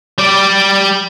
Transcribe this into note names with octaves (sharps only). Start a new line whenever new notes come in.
G3 D5